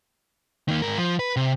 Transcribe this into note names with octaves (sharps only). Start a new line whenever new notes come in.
D#3 A#3
G#2 A#4
F3
B4
C3